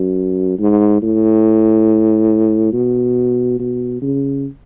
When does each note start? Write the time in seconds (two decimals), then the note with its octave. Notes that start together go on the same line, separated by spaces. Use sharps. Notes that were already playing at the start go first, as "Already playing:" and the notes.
Already playing: F#2
0.59 G#2
1.02 A2
2.73 B2
3.59 B2
4.02 C#3